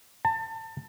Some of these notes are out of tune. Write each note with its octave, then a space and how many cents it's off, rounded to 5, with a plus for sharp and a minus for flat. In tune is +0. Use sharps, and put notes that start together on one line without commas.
A5 +30